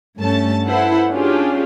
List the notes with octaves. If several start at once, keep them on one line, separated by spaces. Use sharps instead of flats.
G2 A3 C#4 A5
E4 A4 B4 C5 F#5
C#4 D4 F4 G4 G#4